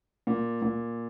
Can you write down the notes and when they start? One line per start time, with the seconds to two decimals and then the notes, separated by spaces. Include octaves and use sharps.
0.27 A#2
0.62 A#2